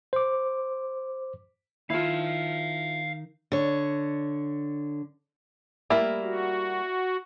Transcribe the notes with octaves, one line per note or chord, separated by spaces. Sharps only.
C5 D6
D#3 E4 F4 F5 A5
D3 C#5
G3 A#3 E4 A#4
F#4